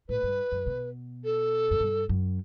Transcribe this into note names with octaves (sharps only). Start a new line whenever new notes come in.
A2 B4
G2
F#2
B2
A4
F#2
G2
F#2